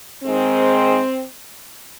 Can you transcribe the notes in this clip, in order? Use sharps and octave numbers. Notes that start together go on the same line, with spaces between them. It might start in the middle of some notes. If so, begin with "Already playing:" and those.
G#2 D#3 G#3 C4